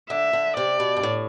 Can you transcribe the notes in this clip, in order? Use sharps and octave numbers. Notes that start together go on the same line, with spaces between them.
D3 E5
D3
C3 D5
B2
G2
A2